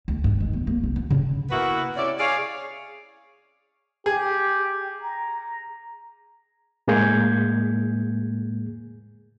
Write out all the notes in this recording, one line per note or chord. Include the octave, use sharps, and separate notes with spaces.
D2
G2
D#3
G1
A#3
C2
F4
C#3
A#3 B3 E4 F#4 B4 E5
C3 C#4 E4 D5
G#4 C#5 D5 F5
G4 G#4
A#5
A2 G#3 A#3 G#4 G6 G#6